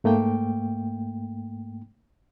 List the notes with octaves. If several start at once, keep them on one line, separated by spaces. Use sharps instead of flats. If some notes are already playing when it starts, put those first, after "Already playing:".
G#2 A3 A#3 G5